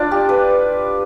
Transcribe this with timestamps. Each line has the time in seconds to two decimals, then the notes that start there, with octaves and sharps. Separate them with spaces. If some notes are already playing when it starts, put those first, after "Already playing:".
Already playing: D4 F4 D5
0.11 G4
0.29 B4